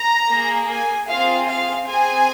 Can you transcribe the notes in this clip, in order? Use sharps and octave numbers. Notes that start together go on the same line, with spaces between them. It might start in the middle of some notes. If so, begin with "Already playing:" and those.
Already playing: A#5
A#3 G#4
G#5
C4 F4 G#4 F5
F5
C4 G#4 G#5